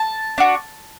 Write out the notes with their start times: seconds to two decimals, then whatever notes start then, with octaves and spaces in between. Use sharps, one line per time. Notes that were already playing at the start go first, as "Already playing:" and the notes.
Already playing: A5
0.38 D4 F#4